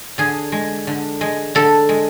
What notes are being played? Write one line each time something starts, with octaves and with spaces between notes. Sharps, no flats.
D3 G#4
G#3
D3
G#3
D3 A4
G#3